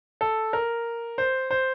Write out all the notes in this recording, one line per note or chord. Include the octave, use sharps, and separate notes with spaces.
A4
A#4
C5
C5